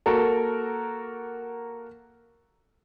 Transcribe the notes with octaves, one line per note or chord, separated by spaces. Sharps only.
A#3 F#4 A4 A#4